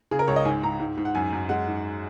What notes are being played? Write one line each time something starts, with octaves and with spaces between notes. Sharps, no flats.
C#3 G#4
A#4
C#2 C#5
D#5
G#2 G#5
G#2 A#5
G#2
G#2
F#5
F#2 G#5
F#2
G#3 F#5
G#2